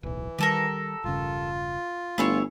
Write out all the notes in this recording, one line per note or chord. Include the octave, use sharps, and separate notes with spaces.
D1 B1 E3
D#3 G3 G4 A4 A#4
E1 G2 C#3 F4
G1 A3 E4 G#4 C#5